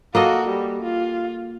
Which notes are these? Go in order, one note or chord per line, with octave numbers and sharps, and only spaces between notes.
A#3 F#4 A4 D#5
G3
F4